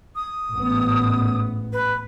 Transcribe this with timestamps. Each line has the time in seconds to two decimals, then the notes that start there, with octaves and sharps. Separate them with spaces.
0.16 D#6
0.52 A1 G#2 B3
1.73 B4